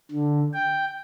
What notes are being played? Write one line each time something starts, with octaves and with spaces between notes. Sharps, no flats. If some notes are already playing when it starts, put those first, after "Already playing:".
D3
G5